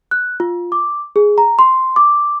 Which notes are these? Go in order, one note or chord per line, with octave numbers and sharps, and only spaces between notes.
F#6
F4
D6
G#4
A#5
C6
D6